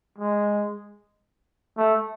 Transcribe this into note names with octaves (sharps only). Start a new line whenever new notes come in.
G#3
A3